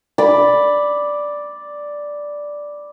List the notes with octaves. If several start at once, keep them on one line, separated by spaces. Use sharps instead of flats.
D5 B5